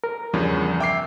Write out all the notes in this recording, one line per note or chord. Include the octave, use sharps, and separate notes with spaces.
A#4
E2 G2 C#3 F3
E5 G5 D6 C7